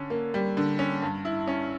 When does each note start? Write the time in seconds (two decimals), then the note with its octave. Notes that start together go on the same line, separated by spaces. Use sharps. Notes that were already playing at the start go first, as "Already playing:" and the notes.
Already playing: D3 C#4
0.10 A#3
0.34 G3
0.57 D3
0.79 C#4
1.02 G2
1.25 E4
1.47 C#4